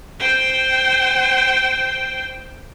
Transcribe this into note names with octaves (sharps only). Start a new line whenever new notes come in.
C5 G5